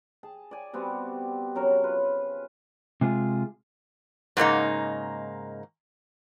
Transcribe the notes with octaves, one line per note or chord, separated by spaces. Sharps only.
G#4 A5
D5 G#5
G3 B3 C4 F#4
C#3 F#3 A#4 C#5
F4 B4
C3 G#3 F4 G#4
G#2 C#3 A#3 D#4